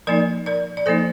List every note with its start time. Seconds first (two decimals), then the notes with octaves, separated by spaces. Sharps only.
0.07 F3 A#3 D#4 A#4 D5
0.46 A#4 D5
0.77 D5
0.86 F3 A#3 D#4 A4 C5